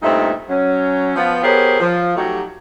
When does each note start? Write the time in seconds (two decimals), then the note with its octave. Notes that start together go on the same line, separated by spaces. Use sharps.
0.02 G2 A#2 A3 C4 D#4 E5
0.49 F#3 C#4
1.16 F3 B3 F4
1.44 B3 G4 G#4 A#4 C5 C#5
1.80 F3
2.16 F#3 A3 D#4 F#4 G4